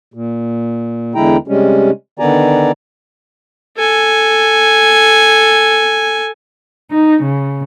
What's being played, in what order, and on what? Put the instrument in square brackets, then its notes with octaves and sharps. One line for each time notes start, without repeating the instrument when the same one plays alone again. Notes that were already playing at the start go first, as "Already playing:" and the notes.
[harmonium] A#2
E2 D3 G#3 E4 G5 A#5
C3 G3 G#3 C#4
D3 D#3 B3 D5 G#5 A#5
[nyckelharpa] A4 G#5
[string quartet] D#4
C#3